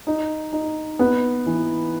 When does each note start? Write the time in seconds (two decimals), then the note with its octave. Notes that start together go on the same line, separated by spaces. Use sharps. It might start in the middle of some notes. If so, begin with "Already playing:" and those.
0.07 D#4
0.53 D#4
0.99 B3
1.46 E3